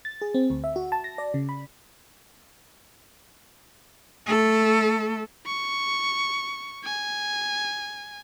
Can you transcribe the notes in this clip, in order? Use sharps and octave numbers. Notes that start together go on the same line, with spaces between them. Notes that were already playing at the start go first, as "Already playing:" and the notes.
A6
G#4
C4
D2
E5
F#4
A5
A#6
D5
C#3
B5
A3 A4
C#6
G#5